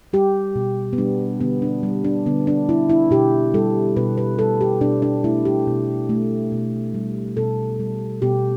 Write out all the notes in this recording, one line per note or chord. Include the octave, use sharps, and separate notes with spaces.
G3 G4
B2
B3
G3 D4
D3 B3
D4
G3
D4
D3 B3
D4
G3 E4
E4
B2 G4
G3 A4
B2 B4
B4
G3 A4
G4
B2 D4
D4
A3 E4
G4
B2
A3
B2
G3
B2 A4
G3
B2 G4